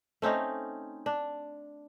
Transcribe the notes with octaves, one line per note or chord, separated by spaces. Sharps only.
A3 C4 C#4 D#4
D4